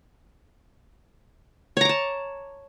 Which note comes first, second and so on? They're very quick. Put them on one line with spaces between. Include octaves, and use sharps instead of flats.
C#5 A#5 D6 A5